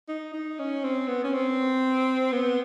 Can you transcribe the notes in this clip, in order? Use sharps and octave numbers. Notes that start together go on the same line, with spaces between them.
D#4
D#4
C#4
C4
B3
C#4
C4
B3